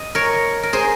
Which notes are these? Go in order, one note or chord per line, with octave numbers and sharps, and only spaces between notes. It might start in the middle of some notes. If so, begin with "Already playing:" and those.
Already playing: D#5
A#4 C#5
A#4
G#4 C5